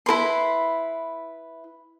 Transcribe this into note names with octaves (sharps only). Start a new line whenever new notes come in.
E4 A#4 B4 C6